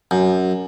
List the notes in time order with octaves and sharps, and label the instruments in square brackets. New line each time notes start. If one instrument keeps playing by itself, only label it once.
[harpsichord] F#2